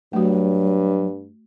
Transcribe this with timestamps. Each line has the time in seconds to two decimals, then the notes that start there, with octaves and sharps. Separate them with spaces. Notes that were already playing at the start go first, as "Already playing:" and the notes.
0.13 G2 F#3 A3 F#4